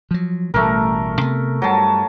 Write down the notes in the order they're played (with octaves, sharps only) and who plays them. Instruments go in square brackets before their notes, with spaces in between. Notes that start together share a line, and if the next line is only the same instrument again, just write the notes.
[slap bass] F3 F#3
[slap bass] A1 B2 G3 [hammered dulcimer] A3 A#4
[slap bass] C3 B3
[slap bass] G2 G3 [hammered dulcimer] F#3 A5